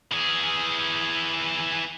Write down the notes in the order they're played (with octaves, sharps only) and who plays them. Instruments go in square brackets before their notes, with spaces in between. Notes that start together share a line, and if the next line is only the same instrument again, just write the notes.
[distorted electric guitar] E3 G#4